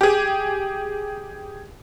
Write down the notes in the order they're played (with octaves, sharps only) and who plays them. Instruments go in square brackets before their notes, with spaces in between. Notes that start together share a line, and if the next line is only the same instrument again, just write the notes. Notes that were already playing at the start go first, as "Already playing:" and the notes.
[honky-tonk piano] G4 G#4